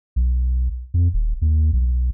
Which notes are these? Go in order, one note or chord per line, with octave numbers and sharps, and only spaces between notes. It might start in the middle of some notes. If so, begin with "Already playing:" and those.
B1
F2
D#1
D#2
B1